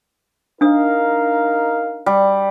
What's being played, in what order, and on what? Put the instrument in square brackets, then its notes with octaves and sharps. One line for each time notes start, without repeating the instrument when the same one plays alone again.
[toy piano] D4 D#6 [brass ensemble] D#4 A#4 F5
[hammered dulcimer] G3